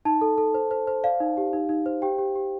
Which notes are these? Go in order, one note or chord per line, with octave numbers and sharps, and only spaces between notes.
D#4 A5
A4
A4
C5
C5
C5
D5 F5
D#4
G4
D#4
D#4
C5
G4 G5
G4
G4